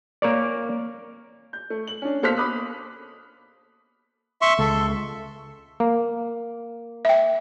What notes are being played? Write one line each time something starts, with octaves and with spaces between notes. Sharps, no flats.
A#3 A#4 C#5 D5
G6
A3
F#7
C#4 D4
B2 A#3 A4 C5 F6 B6
B5 D6 D#6 F#6
E5 C6 C#6
C#2 A4
A#3
E5 G5